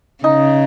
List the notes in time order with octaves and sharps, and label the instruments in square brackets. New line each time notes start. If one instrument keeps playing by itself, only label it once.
[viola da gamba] C#3 [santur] D#4